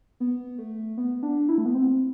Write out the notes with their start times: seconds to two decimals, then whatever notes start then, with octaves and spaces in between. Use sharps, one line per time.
0.20 B3
0.58 A3
0.97 B3
1.23 D4
1.49 E4
1.58 A3
1.65 B3
1.74 C4